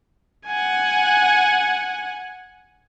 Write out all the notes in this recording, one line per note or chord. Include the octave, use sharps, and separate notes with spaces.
F#5 G#5